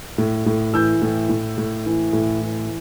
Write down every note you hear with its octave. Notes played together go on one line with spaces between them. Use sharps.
A2
A2
E3 E6 G6
A2
A2
A2
E3
A2
E3